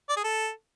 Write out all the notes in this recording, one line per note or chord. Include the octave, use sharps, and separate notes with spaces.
D5
G#4
A4